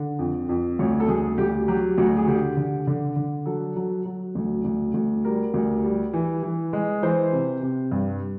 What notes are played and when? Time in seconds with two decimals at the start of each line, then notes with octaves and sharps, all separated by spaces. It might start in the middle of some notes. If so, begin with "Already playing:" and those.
Already playing: D3
0.19 F2
0.49 F2
0.79 D2 C#5
1.00 A4
1.08 D2 G#4
1.38 D2 G4
1.68 F#3 G4
1.98 D2 F#4
2.17 G#4
2.27 D3 G4
2.57 D3
2.87 D3
3.16 D3
3.46 F#3 A4
3.76 F#3
4.05 F#3
4.35 D2
4.64 D2
4.94 D2
5.25 G3 A#4
5.54 D2
5.84 G3
6.13 E3
6.43 E3
6.73 G#3
7.03 E3 C5
7.33 C3
7.63 C3
7.91 G2